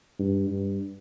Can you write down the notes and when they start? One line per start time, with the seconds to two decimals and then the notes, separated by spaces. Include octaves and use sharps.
0.19 G2
0.50 G2